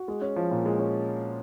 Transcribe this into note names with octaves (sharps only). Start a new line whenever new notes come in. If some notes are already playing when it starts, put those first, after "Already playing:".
Already playing: F#4
G#3
C#4
F3
A#2
G#3
C#4